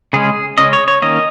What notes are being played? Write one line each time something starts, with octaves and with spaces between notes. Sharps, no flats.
C#3 G#3 C#4 G#4
C#3 G#3 C#4 D#5
C#5
C#5
D#3 A#3 C#4 D#5